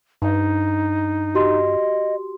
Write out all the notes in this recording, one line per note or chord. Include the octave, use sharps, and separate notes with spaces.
G2 D#4
F#4 G4 D#5 C6